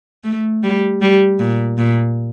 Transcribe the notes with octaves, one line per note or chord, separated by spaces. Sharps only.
A3
G3
G3
A#2
A#2